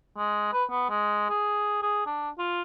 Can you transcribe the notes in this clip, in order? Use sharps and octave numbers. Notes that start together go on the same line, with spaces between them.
G#3
B4
B3
G#3
G#4
G#4
D4
F4